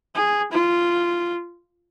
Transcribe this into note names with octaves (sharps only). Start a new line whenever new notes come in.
G#4
F4